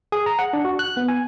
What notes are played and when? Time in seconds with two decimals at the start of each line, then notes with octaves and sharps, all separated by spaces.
0.12 G#4
0.26 A#5
0.39 F#5
0.53 D4
0.65 F#4
0.79 F#6
0.97 B3
1.08 G#5